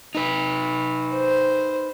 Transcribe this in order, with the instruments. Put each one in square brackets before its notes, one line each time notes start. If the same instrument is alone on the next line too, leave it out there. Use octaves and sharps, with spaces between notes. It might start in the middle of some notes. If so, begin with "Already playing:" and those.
[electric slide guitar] D#4 B4
[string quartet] C5